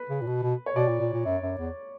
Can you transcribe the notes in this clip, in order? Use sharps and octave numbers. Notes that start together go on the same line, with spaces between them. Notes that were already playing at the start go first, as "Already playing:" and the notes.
Already playing: B4
C#3
A#2
B2
B2
C#5
B2 D5
A#2
A#2
A#2
F#2
F#2
E2